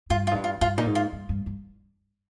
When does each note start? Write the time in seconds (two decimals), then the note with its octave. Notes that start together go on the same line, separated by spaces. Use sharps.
0.10 G2 F4
0.27 F4
0.31 G#2
0.35 G2
0.44 F4
0.61 G2 F4
0.78 A#2 D#4
0.86 G#2
0.95 F4
1.12 G2
1.29 G2
1.46 G2